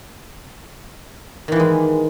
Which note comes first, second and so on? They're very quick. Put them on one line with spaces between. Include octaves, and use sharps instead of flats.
D#3 E3 A#3 G#3